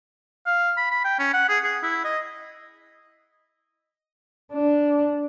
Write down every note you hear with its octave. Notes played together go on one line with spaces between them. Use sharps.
F5
B5
B5
G5
C#4
F#5
G#4
G#4
E4
D#5
D4